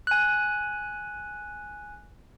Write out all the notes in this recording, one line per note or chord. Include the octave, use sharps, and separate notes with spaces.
G#5 F#6